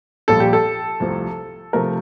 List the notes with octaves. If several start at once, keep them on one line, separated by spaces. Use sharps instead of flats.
A#1 A#2 G3 A4
G4
A4
C2 C3 F3 A3
C3 F3 A3 A#4